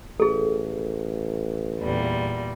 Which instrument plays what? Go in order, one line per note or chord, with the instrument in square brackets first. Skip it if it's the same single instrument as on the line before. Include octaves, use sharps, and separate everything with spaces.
[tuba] A1 [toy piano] G#4 A4
[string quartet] E2 A#2 G3